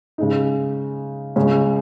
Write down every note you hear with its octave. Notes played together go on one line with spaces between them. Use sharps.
C#3 G#3 D#4
C#2 C#3 G#3 C#4